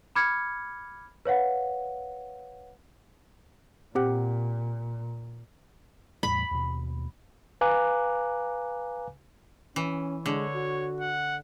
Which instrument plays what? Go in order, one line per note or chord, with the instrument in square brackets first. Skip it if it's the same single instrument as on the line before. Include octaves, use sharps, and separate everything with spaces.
[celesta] B5 D6 F6 G#6 C#7
B4 C#5 F5 F#5
[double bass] A#2 [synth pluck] C4 G4 F#5
[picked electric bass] E2 A2 G3 [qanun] B5
[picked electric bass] D#2 B2
[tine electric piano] B4 F5 G#5 A#5 D6 F#6
[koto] E3 [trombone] C#4
[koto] D3 [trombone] G#3 [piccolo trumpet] C#5
[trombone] F#4
[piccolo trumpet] F#5